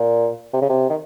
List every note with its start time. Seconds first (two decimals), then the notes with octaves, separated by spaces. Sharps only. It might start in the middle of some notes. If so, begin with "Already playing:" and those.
Already playing: A#2
0.54 C3
0.62 C#3
0.70 C3
0.90 D#3